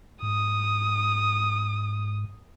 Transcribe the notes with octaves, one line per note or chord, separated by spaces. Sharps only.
G#2 D#6